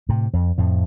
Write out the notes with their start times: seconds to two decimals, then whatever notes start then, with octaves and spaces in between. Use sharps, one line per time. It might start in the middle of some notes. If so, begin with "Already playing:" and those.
0.09 A2 C3
0.33 F2
0.58 F2 A2